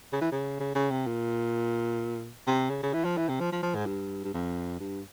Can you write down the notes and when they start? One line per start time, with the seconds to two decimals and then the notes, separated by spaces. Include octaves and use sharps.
0.13 C#3
0.22 E3
0.32 C#3
0.60 C#3
0.75 C#3
0.91 C3
1.07 A#2
2.47 C3
2.70 C#3
2.83 C#3
2.94 E3
3.05 F3
3.17 E3
3.29 C3
3.40 F3
3.52 F3
3.63 F3
3.75 G#2
3.86 G2
4.24 G2
4.34 F2
4.80 G2